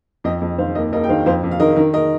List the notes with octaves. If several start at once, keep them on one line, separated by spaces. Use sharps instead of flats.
F2 D#5 G5
F2
D#3 C5 F5
D#2 A#4 D#5
D#2 A#4 D#5
G5
D#3 C5 F5
F2 C5 F5
F2
F5
D#3 A#4 D#5
D#3 A#4
A#4 D#5